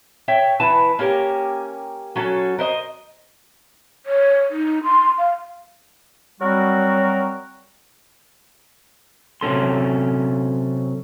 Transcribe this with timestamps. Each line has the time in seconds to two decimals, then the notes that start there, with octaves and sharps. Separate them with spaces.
0.28 C#5 E5 G5
0.60 E3 E4 B4 A5
0.99 A#3 C#4 G4 A#4
2.16 F#3 C#4 A4
2.58 A#4 C5 D#5
4.06 C#5
4.50 D#4
4.84 C6
5.18 F5
6.41 F#3 G3 C4 F#4 A#4
9.41 C3 F#3 C#4 A4 C6